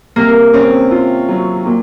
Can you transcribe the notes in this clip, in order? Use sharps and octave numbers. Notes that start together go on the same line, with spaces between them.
C3 A#3
C4 C#4
F4
F#3
A#2